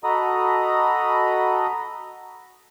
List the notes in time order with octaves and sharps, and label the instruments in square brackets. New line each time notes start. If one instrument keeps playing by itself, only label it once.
[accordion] F#4 A4 D#5 A#5 B5 D#6